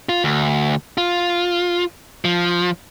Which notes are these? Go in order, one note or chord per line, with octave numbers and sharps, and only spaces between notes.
F4
D2
F4
F3